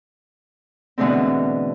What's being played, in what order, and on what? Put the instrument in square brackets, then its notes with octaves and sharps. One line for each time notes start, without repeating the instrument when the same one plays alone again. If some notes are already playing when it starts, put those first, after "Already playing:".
[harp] B2 D3 E3 G#3 A3 C4